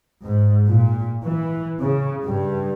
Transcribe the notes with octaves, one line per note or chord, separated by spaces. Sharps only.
G#2
A#2
E3
C#3
G2